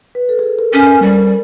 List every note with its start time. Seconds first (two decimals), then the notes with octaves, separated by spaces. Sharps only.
0.15 B4
0.29 A4
0.39 G#4
0.43 A4
0.59 A#4
0.72 C#4 A#4
0.87 A#4
1.02 G3 C5
1.16 A#4